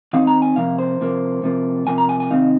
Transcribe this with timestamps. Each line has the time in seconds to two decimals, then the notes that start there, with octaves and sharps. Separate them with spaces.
0.13 D#3 C4 D#4 F5
0.27 A#5
0.42 G#5
0.56 C3 F3 A#3 F5
0.79 C5
1.01 C3 F3 A#3
1.43 C3 F3 A#3
1.87 C3 F3 A#3 G#5
1.98 A#5
2.09 G#5
2.20 G#5
2.30 C3 D#3 C4 D#4 F5